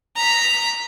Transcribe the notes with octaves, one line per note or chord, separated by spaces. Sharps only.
A#5 B6